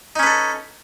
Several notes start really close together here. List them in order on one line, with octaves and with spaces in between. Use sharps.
D#4 C#4 B4 A4